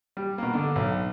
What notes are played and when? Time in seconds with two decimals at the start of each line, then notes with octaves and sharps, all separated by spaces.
0.17 G3
0.38 B2 A#3
0.54 D3 D4
0.76 B1